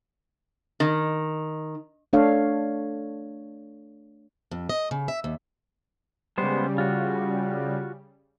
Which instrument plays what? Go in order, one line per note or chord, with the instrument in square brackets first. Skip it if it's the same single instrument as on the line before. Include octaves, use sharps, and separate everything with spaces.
[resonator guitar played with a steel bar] D#3
[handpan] A3 D4 A4 C#5 F5
[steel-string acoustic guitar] F2
D#5
C#3
E5
D#2
[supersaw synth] C#3 G3 [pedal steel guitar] G#3 B3 C5
[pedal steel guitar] F4 F#4